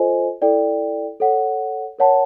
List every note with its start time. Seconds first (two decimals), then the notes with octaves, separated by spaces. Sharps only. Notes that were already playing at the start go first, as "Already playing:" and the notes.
Already playing: F4 A4 C5 D#5 G#5
0.42 E4 A4 D5 G5
1.20 A4 C#5 F#5
1.99 A#4 C#5 F#5 A5